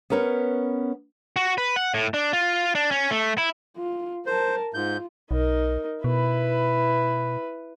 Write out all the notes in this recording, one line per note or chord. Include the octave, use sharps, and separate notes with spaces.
B3 C#4 A#4 B4 C#5
F#4
B4
F#5
A2
D4
F4
D4
C#4
A3
E4
F4
A#4 C5 A5
G#2 F4 G6
B1 D#4 A#4
B2 E4 B4